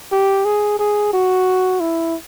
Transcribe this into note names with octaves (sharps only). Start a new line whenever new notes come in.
G4
G#4
G#4
F#4
E4